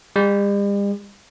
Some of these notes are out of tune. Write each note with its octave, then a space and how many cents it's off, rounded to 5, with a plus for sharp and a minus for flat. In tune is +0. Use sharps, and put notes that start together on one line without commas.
G3 +45